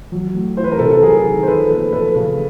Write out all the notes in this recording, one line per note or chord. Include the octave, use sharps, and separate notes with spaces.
F#3
A2
E3 C5
B4
A#4
C3 A4 B4
A4
F#3 G#4 A#4
D#3
C5
F3 A4 B4
A#2 A4 B4
F3 A4 B4
C#3